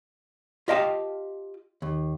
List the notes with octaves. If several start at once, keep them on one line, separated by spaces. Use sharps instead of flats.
F4 G4 D#5 F5 G5 A5
D#2